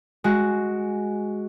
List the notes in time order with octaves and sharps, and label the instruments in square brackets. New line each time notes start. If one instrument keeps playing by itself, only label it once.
[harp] G#3 F#4